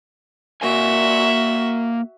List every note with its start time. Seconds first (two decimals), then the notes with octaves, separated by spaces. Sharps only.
0.62 A#3 F#4 A#4 E5 G#5